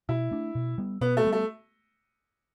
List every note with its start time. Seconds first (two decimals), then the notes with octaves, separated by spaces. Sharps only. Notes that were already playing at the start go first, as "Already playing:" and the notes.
0.09 B2 E4
0.31 A3 D4
0.55 B2
0.78 G3 B3
1.01 B2 B3
1.17 A3
1.25 G3 B3
1.32 A3